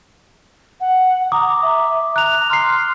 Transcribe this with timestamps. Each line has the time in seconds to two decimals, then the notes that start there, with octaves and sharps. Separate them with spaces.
0.80 F#5
1.32 A#5 D6 D#6
1.62 E5
2.16 A#5 F#6 F7
2.50 C6 F6 C7